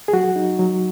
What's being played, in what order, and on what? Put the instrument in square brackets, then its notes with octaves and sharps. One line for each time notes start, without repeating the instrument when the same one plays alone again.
[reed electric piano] G#4
F#3 F#4
D#4
F#3